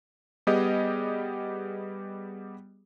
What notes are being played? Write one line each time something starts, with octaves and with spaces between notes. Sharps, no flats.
G3 B3 G4 G#4 D#5